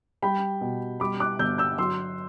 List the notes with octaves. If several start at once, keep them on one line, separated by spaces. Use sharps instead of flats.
G3 G5 B5
B2
G3 B5 D6
D6 F#6
G1 E6 G6
E6 G6
F#3 C6 E6